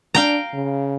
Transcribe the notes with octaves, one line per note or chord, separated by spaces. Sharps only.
D4 F5 G5 A#5
C#3